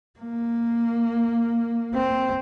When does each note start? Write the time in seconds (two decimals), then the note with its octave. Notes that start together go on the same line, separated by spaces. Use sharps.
0.19 A#3
1.94 C4